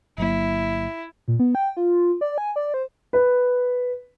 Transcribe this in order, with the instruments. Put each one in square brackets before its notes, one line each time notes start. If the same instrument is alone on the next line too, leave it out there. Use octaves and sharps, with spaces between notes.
[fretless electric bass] G1 F#3 A#3 [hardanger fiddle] E4
[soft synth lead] A#2
B3
G5
F4
D5
G#5
D5
C5
[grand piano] B4